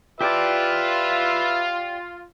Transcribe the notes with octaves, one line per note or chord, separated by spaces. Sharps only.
F4 G4 B4 D5 E5 A5